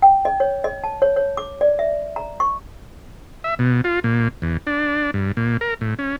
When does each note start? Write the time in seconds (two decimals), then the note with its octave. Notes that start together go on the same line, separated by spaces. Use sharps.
0.02 G5
0.25 D#5
0.40 C#5
0.64 D#5
0.84 A5
1.02 C#5
1.16 C#5
1.37 D6
1.61 D5
1.79 E5
2.16 A#5
2.40 C#6
3.44 E5
3.59 B2
3.84 F4
4.04 A#2
4.42 E2
4.67 D4
5.14 G2
5.37 A#2
5.61 A#4
5.81 A2
5.99 C#4